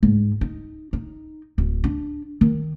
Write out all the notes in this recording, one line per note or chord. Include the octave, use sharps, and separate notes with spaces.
G#2
D#4
D#4
D1
D4
D#3